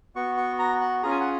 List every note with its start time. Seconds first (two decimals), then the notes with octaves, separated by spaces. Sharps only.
0.16 B3 F#4 C#6
0.37 C#6
0.59 A#5
0.81 F#5
1.03 C#4 F4 G#4 A#5
1.11 G#5
1.21 F#5